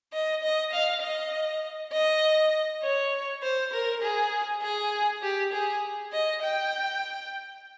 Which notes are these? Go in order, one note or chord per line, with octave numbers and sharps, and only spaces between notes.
D#5
D#5
F5
D#5
D#5
C#5
C5
A#4
G#4
G#4
G4
G#4
D#5
G5